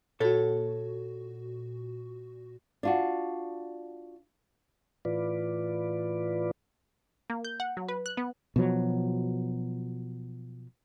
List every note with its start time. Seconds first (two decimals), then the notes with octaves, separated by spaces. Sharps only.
0.20 A#2 F#4 A4 C#5
2.83 D4 F4 F#4
5.05 A2 E3 F4 B4 D5
7.30 A#3
7.45 G6
7.60 F#5
7.77 F#3
7.89 B4
8.06 F#6
8.17 B3
8.56 B2 F3 F#3